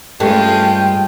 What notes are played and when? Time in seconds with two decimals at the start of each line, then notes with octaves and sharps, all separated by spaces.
0.20 G2 G#3 A3 C#4 F4 G5